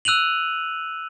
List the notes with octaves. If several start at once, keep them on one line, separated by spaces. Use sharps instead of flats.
E6 F#6 D#7 F7 F#7